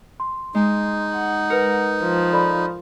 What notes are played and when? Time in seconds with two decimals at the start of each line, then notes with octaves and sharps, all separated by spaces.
0.20 C6
0.55 G#3 D#4
1.14 F#5
1.50 A#4 B4 C#7
2.01 F3
2.32 A4 D5 B5